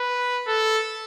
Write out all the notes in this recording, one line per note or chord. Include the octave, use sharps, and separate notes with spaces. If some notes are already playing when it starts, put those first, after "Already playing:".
Already playing: B4
A4